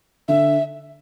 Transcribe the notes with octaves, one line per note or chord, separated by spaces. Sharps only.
D3 E5